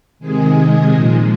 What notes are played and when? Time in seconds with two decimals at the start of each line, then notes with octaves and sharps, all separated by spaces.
0.19 C3 D#3 G#3 G#4
0.57 G#4
0.93 A#2 F3 G#3